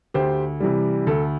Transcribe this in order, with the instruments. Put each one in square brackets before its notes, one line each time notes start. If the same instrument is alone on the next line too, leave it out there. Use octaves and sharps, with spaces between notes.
[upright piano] D2 G4 C5
C3 E3 G3
D2 A4